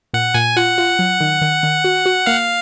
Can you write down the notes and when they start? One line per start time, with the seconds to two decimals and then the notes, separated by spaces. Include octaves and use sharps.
0.14 A#2 F#5
0.34 A#2 G#5
0.56 F4 F#5
0.78 F4
0.99 F#3
1.21 D#3
1.42 D#3
1.63 D#3
1.84 F#4
2.06 F#4
2.26 A#3 F5